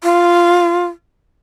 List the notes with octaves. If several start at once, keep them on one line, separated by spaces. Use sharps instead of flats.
F4